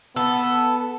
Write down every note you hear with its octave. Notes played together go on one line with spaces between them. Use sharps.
B3 A4